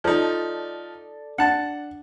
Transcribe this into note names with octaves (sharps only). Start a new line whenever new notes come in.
F3 D#4 A4 D5 A5
D4 F#5 A5